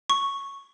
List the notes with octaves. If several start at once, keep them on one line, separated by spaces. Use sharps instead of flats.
C#6